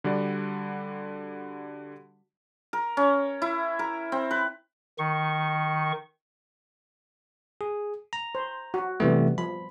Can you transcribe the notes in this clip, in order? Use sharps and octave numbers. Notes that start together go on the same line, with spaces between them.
D3 G3 F#4 D5
A#4
C#4
E4
A#4
C4
B4
D#3 C#6
G#4
A#5
C5
F#4
C3 E3 G3 A3 B3
F3 B5